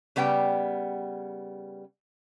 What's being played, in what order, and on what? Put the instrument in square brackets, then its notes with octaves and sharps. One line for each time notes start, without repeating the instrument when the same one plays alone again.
[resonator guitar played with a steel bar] C#3 G3 B3 G5